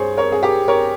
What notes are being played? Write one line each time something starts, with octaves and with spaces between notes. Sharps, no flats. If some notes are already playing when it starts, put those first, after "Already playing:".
Already playing: G2 G#4 C5 C#5
A#4 C#5
G#4
G4 A#4
A#4 C#5